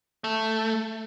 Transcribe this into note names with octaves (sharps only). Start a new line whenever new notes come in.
A3